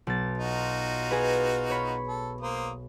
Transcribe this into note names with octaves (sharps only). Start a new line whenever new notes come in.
B1 A6
D#4 F4 F#4
G#4 B4
C#5 B5
A4
A#3 C5 D#6